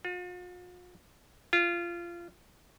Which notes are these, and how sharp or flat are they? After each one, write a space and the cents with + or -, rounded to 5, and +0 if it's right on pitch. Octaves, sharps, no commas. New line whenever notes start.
F4 +45
F4 -20